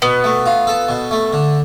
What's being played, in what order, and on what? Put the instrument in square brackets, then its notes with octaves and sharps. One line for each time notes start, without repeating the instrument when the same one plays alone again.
[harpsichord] B2 [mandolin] B3
[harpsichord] A3
F4
A4
B2
A3
D3